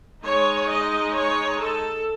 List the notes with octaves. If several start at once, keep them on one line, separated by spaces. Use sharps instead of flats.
G#3 D#4 C#5
D#5
C#5
A4